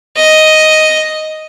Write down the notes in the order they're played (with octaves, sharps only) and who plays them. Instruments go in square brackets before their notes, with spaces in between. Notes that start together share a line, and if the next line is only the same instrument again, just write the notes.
[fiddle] D#5